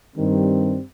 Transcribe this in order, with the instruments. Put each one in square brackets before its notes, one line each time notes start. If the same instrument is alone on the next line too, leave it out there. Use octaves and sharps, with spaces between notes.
[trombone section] G2 D#3 G3 C4